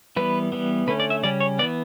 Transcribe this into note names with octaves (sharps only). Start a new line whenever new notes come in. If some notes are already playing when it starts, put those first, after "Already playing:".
E3 G3 B3 B4
E3 G3 B3
D3 A3 C#4 B4
D5
E5
C#3 G3 C#4 D5
C#5
E3 B3 D5